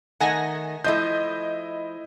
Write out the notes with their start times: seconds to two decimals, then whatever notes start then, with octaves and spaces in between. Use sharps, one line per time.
0.20 D#3 A3 D#4 F#5 G#5 A#6
0.84 F3 A3 E4 D#5 G6